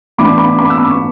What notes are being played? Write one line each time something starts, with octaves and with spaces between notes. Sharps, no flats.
A2 E3 B3 D4 B5 D6
B5 D6
B5 D6
E6
B5 D6
C#6